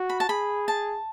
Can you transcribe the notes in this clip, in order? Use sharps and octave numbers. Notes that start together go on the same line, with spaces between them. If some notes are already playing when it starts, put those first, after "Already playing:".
Already playing: F#4
B5
A5
G#4 B5
A5